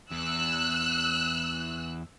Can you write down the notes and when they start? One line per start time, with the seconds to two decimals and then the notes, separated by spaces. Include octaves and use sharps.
0.11 E2 E6 F#6